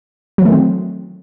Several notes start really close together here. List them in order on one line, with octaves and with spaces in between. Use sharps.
F#3 E3 A3 D#3 C4